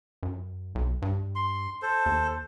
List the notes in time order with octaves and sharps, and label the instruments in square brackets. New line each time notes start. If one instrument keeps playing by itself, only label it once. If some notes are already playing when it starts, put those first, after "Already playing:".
[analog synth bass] F#2
B1
G2
[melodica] C6
A4 C5
[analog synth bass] D#2